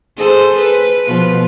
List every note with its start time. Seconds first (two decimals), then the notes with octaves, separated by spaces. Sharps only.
0.16 G#4 A4 C5
0.58 B4
1.05 B2 F3 B4